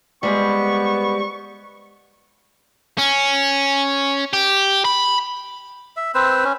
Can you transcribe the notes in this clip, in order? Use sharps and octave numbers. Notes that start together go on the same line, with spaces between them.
G3 G#3 B3 C4 C#6
C#4
G4
B5
E5
C4 B4 C5 E6
C#4